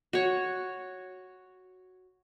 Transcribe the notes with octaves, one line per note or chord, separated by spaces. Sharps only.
F#4 C#5